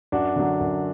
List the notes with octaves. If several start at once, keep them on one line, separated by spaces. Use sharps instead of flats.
F#2 D4 F#4
D3 F#3
F#2